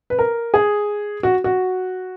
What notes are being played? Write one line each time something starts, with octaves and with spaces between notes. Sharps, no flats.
B4
A#4
G#4
F#4
F#4